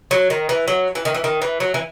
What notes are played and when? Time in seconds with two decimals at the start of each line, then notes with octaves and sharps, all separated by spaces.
0.11 F#3
0.30 D#3
0.49 E3
0.68 F#3
0.95 E3
1.05 D#3
1.14 E3
1.24 D#3
1.42 E3
1.60 F#3
1.74 E3